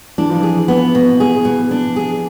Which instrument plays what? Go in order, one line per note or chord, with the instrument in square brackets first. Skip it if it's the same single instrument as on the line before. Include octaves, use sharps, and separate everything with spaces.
[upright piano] E3 [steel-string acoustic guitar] D4
[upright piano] F3
[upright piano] E3 [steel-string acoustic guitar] G#4
[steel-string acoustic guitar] B3
B2
G#4
B2
D4
G#4